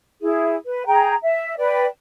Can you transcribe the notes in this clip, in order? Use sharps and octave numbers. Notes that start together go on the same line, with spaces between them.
E4 G#4
B4
G#4 G5 A#5
E5
B4 D5 G5